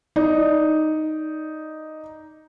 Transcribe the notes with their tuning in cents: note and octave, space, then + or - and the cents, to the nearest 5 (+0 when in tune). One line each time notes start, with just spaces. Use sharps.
D#4 +0 D5 +0